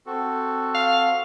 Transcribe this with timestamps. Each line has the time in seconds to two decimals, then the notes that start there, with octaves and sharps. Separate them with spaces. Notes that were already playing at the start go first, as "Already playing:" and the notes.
0.06 C4 F#4 A4
0.75 F5